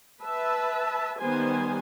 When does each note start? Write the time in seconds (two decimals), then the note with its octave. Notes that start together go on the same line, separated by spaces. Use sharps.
0.21 B4 E5 A5
1.19 D#3 G3 B3 C5 G#5